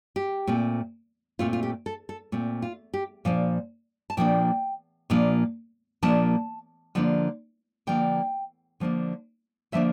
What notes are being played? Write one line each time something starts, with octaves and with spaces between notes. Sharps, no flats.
G4
A#2 A3 C4
A#2 A3 C4 F4
F4
G4
A4
A4
A#2 A3 C4
F4
G4
A#2 F3 A#3 D4 F5
A5
A#2 F3 A#3 D4 G5
A#2 F3 A#3 D4
A#2 F3 A#3 D4 A5
D3 F3 A#3 D4
D3 F3 A#3 D4 G5
D3 F3 A#3 D4
D3 F3 A#3 D4 E5